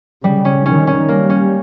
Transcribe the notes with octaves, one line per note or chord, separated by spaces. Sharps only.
C#3 G3
C#4
D#3 C#4
C#4
G3 A#3
C#4